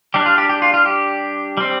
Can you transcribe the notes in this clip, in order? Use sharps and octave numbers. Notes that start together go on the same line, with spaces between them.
G3 D4 G4
F4
G4
G4
F4
F4
G4
G3 C4